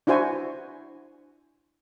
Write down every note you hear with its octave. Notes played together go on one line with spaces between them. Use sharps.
D4 E4 F#4 C5 G#5